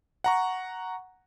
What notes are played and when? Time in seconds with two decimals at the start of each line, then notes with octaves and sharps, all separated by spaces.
0.24 F#5 A#5 C#6